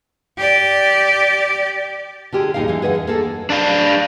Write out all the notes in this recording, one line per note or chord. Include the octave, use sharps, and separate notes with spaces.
G4 D5
D3 F4 G4 G#4
D#2 A#2 C#3 D#4 G#4 F5
D3 E3
G#4 B4 D#5 F#5
E2
A#3 G#4 A4
D4 F5